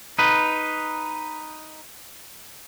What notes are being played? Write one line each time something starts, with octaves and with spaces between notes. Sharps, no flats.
D#4 B4